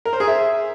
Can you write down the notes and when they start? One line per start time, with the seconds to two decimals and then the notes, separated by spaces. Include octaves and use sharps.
0.05 A#4
0.13 C5
0.20 G#4
0.28 E5